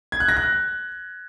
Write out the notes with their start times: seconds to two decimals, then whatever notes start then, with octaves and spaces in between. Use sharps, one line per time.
0.12 G#6
0.20 F#6
0.28 A#6
0.37 F#6